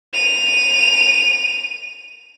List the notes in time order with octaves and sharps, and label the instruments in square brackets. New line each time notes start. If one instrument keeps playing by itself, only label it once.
[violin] D#7 F7